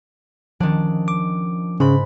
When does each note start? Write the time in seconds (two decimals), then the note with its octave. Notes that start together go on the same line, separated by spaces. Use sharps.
0.60 D#3 F3 C#4 D4
1.08 D6
1.80 G#2 C#3 B5